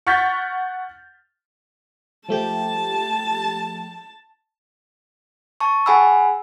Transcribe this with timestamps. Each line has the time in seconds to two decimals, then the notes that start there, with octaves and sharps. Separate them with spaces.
0.07 F#5 C#6 F6 G6 A6 B6
2.29 F3 A3 G4 A5
5.60 A5 C#6
5.86 G#4 F#5 G#5 B5 E6